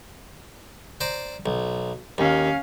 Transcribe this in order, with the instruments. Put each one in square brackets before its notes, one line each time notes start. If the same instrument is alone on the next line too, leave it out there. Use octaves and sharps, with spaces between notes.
[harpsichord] C5 D5 A#5
B1
[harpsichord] D#2 [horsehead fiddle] C#4 F5